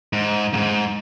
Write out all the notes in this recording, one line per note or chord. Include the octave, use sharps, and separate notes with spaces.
G#2
F2 G#2